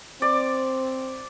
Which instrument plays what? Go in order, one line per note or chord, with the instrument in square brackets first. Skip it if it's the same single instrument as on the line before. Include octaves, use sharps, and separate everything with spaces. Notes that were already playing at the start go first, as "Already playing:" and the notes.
[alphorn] C4 [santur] D5